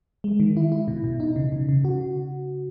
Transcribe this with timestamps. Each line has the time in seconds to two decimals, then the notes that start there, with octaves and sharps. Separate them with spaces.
0.24 G#3
0.40 D#3
0.57 E4
0.72 E4
0.88 B2
1.04 B2
1.20 D#4
1.36 C#3
1.53 C#3
1.69 C#3
1.85 F#4